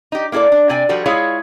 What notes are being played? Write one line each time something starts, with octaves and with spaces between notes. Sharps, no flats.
D#4 G4
A#3 E4 F#4 A4 D5
D4
C3 D5 G5 G#5
F3 G3 F#4 A4
G#3 E4 F4 G#4 C#5 F5